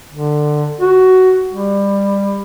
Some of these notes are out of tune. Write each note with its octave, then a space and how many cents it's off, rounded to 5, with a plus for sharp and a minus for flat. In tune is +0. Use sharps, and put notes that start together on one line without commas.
D3 +20
F#4 +10
G3 +25